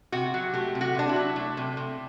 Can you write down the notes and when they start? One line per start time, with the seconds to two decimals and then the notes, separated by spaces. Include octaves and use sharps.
0.12 C3 F#4
0.34 F#3
0.53 A3 G4
0.75 C3
0.81 F#4
0.95 C3 D4
1.09 E4
1.16 F#3
1.36 A3
1.57 C3
1.77 C3